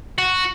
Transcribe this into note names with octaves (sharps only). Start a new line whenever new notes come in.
F#4